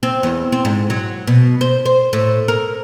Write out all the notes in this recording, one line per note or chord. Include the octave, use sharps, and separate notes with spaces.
C4
E2
C4
G#2
F#3
B2
C5
C5
A2
A#4